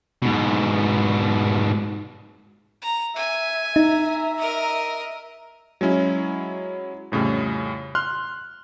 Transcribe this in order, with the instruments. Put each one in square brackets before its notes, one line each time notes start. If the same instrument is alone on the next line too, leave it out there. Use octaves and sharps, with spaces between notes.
[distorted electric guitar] G#2 B2
[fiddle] A#5
[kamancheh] E5 [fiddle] G#5
[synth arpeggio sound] D#4 [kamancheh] E5 A#5
[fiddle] A#4 D#5
[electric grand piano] F#3 G#3 C#4 E4
F2 A2 C#3 G3
C6 F6 F#6